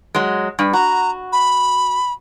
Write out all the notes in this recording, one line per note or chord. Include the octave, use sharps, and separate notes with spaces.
F#3 G#3
G2
F#4 A#5
B5